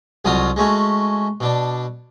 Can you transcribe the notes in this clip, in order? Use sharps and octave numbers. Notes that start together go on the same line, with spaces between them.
C2 F2 F#3 F4 F#4 D#6
G#3 A3 C#4 F#4
B2 D4